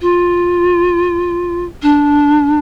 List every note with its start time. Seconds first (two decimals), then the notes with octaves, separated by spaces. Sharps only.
0.01 F4
1.82 D4